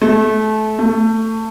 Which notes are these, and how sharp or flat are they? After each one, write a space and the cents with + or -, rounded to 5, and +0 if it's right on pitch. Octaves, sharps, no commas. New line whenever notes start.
A3 -25
A3 +20